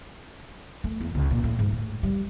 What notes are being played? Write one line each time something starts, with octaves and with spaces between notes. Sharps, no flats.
A3
E2
C#2
A#2
A2
G#2
A2
G3